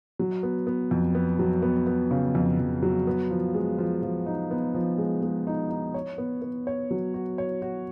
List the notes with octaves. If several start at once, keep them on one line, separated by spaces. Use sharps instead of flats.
F#3
B3
B3
F2
B3
F#3
B3
B3
C#3
F2
F2
F#3
B3
F3
G#3
F3
F3
D#4
B3
F3
G#3
G#3
D#4
D#4
C#5
B3
B3
C#5
F#3
F#4
C#5
F#4